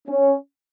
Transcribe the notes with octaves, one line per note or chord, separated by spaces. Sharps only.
C#4